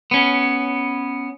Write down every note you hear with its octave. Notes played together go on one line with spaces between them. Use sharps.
B3 C#4